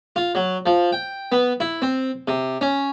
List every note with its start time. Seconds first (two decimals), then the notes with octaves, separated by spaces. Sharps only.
0.16 F4
0.35 F#3
0.66 F3
0.92 G5
1.32 B3
1.60 E4
1.82 C4
2.28 C3
2.61 C#4